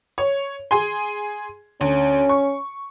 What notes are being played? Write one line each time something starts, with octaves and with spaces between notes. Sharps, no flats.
C#5
G#4 G#5 C6
D2 C#4
C#6